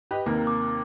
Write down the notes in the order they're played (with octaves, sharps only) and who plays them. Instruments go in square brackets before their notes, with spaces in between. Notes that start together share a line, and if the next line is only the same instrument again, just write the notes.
[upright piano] G4 B4 D#5
D#2 C3 A#3
[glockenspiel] D6